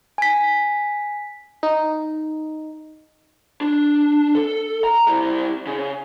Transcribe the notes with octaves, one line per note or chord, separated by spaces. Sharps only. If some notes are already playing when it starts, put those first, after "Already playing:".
G#5 B6
D#4
D4
A4
A#5
G3 E4
C#3